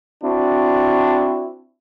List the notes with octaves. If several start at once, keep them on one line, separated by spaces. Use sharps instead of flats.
C4 D4 E4 F#4